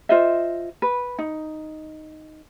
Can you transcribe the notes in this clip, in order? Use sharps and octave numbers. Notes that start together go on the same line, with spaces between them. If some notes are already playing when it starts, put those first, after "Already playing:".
F4 C5 D#5 E5
B4
D#4